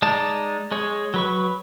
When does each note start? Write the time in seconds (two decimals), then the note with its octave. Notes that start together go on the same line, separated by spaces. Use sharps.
0.02 G#3 D#4 D5 A5
0.71 G#3 G#4 C#5
1.14 F#3 B4 C#6